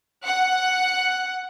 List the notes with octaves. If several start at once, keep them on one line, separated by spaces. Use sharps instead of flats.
F#5